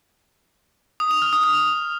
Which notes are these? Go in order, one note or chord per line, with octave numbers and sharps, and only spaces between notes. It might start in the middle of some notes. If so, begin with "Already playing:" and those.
D#6
F7
F6
D#6
D#6